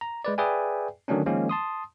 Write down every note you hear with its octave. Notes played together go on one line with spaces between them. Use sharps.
A#5
G#3 B4 D5
G#4 B4 D5 E5 G5 G#5
D3 D#3 F#3 A3 C#4 D4
D#3 F3 G#3 A#3 C#4
A5 C6 D#6